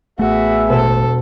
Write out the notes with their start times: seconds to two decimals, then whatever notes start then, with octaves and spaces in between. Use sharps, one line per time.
0.19 A1 A3 B3 F#4 G#4 E5
0.70 E1 A4 C5